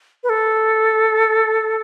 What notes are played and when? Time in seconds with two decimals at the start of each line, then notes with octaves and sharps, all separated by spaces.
0.24 B4
0.29 A4